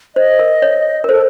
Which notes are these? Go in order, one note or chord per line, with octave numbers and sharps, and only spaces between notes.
C5 D#5
A#4
C#5
A#4
A4 C5